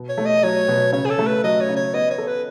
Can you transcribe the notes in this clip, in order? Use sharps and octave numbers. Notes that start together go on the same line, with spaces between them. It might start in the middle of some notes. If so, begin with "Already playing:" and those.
Already playing: B2
C#5
A3
D#5
F#3 C#5
B2
C#3 C#5
G#4
A4
A3
B4
F#3 D#5
C#5
C#3
C#5
B3 D#5
C#5
A4
B4